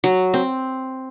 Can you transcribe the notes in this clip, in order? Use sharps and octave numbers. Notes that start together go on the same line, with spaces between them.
F#3
C4